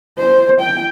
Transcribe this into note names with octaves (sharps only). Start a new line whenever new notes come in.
C5
G5